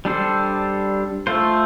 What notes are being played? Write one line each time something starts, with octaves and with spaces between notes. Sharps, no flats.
G3 D4 A4 C5
A3 F4 A4 C5